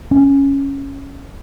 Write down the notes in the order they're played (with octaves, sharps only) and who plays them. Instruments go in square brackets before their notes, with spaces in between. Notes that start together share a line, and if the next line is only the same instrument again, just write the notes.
[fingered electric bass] C#4